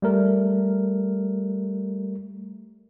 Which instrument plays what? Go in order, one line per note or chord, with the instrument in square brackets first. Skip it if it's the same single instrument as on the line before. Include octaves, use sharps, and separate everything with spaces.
[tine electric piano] G3 A3 A#4